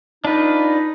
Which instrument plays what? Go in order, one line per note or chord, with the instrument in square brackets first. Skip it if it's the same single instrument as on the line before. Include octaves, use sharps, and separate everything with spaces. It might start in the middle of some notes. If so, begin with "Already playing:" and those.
[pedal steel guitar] D4 F4 B4 [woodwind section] D#4